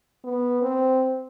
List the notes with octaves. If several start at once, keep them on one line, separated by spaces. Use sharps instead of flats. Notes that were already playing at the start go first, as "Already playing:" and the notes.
B3
C4